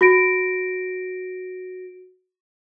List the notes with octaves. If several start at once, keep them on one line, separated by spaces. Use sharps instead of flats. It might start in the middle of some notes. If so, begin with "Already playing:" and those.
F#4 A#6 D7